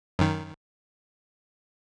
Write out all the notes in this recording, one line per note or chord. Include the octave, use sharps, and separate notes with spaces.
F#2 D#3